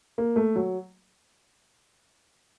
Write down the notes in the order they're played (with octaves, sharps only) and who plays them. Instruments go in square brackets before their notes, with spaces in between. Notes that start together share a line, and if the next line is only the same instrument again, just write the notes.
[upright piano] A#3
A3
F#3